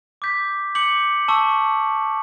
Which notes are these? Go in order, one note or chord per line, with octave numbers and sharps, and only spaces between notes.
D6 G6 B6
D6 G6 C#7 F#7
A5 C#6 E6